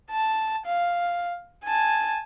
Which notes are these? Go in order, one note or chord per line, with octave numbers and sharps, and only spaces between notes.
A5
F5
G#5 A5